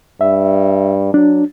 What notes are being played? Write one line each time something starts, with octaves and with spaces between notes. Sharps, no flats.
G2 E5
F#3 D4